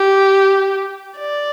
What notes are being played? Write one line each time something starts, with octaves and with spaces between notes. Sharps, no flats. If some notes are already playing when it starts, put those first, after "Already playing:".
Already playing: G4
D5